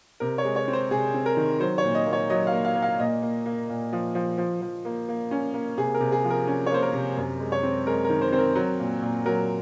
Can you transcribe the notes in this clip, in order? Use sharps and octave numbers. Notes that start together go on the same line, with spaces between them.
C3 A#4
C#5
G#3
C#5
C4
C5
C3 G#4
C4
A#4
D#3
F#3 C5
C#5
A#2
D#5
A#3
C#5
F#3 D#5
F5
A#3
F5
A#3
F5
A#2 D#5
A#3
A#3
A#2
F3
F3
F3
F3
A#3
A#3
C#4
A#3
C3 G#4
A#4
C3
G#4
F3
A#4
C#4
C#5
A#3 C5
A#4
C3
F#2
G#3
C#5
C4
G#3 A#4
A#4
D#3
C5
C4 C5
A#4
F#3
A#2
A#2
F#3 A#4